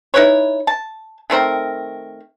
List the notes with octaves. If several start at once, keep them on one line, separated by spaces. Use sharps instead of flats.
D#4 E4 B4 C#5
A5
D#3 A3 C4 A#4